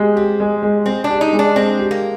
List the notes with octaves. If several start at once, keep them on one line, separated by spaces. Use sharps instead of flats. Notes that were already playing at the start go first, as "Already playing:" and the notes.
Already playing: G#3 G4
C4 G4
G#3
G#3
G#3 C4
D4
G4
D#4
G#3
D4
G#3 C4
G4
A#3